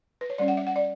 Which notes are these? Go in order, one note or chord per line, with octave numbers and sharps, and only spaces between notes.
B4
C#5
G3 C#4 D5
F#5
E5
F#5
D5